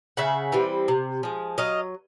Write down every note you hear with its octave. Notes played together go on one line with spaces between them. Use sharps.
C#3 E5 F#5
E3 G3 C4
C3
F3 G#3
F#3 D#5 F5